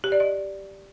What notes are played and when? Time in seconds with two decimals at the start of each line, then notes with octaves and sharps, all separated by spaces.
0.04 G4
0.12 D5
0.20 D#5